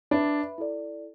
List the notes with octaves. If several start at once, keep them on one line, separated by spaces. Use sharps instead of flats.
D4 B4 E5 B5
E4 A4 D5